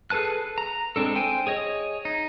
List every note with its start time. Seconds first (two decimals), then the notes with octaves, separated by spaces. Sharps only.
0.10 G#4 A4 B4 A5 F#6
0.58 A#5
0.96 G#3 C4 D4 A4
1.15 C5 G5 G#5
1.47 G#4 C#5 D#5
2.05 D#4